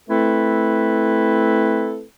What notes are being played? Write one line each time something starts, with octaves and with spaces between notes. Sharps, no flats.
A3 C4 E4 A4 B4